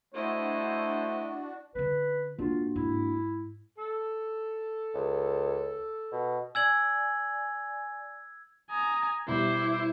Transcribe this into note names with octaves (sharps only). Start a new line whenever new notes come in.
A3 D4 E4 F#4 C5 D#5
D3 C#4 B4
G#2 A#3 D4 F4 F#4
G#2 E4
A4
C#2
B2
D5 G#5 E6 G#6 F#7
G#5 A#5 D#6
B2 G3 E4 C5 D5